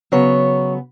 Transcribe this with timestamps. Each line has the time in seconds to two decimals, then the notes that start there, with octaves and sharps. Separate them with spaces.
0.12 C#3 F#3 B3 C#5